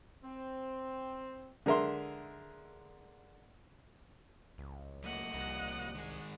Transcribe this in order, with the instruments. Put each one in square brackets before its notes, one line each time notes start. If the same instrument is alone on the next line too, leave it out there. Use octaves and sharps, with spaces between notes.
[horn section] C4
[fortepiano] D3 G#3 A#4 E5 C6
[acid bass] C#2
[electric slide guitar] F#3 A3 A#3 [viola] D#5 F#5
[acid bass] C2 [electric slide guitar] F3 G3 A#3
[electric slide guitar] D#3 G#3 G#4